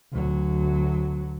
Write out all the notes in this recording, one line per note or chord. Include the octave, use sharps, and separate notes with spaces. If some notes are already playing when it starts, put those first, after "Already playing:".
D2 F#3